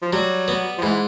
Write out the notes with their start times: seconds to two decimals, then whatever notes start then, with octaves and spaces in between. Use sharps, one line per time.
0.02 F3
0.12 F#3 G3
0.48 B3
0.78 F3
0.82 G#2 E3